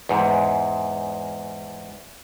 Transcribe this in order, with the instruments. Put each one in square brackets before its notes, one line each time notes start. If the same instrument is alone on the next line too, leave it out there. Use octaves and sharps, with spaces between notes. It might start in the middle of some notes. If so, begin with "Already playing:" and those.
[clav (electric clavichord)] E2 G#2